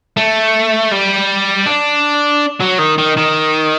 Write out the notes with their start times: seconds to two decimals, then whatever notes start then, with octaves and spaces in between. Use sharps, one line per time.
0.17 A3
0.92 G3
1.66 D4
2.61 F#3
2.79 D#3
2.98 D#3
3.17 D#3